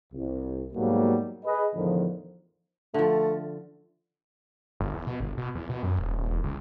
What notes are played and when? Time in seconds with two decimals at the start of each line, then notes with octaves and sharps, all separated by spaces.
0.13 C2
0.74 G#2 B2 F#3 G3 A#3
1.45 G#4 B4 D#5
1.75 E2 A2 D3 D#3 F3
2.94 D3 F3 A3
4.80 G1
4.94 E2
5.07 B2
5.20 G1
5.37 B2
5.55 E2
5.69 B2
5.83 F#2
5.98 D#1
6.17 D#1
6.30 E1
6.43 C#2